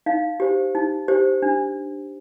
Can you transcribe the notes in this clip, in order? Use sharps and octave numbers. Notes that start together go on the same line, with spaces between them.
D#4 F5
G4 C5
D#4
G4 C5
D4